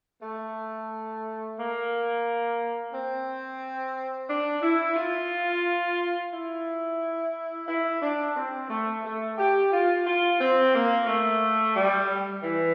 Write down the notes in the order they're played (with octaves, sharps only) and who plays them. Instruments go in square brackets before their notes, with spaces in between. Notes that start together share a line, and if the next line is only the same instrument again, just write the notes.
[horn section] A3
A#3
C4
D4
E4
F4
E4
E4
D4
C4
A3
A3
G4
F4
F4
C4
A#3
A3
G3
E3